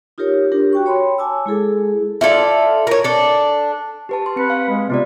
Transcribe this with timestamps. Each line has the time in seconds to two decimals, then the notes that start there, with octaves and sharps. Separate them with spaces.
0.18 D#4 F4 G4 A#4 C#5
0.52 D4 G4 A#4
0.73 F#4 G5 C#6
0.86 C#5 B5 C6
1.18 G#5 A5 D6 E6
1.46 G#3 E4 G#4 A4
2.21 E4 F4 A4 D5
2.87 A#4 C#5
3.04 D4 A4
4.09 G4 B4 A5
4.22 G4 C6
4.36 C4 B4 C#7
4.50 F5
4.69 G#3
4.90 C3 B3 F4 D5